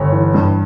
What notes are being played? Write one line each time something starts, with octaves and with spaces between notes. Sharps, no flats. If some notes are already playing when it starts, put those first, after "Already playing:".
Already playing: G1 C#5
E3
G2